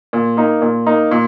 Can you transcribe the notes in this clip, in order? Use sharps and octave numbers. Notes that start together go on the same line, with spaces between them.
A#2
A#3 D#4
A#2
A#3 D#4
A#2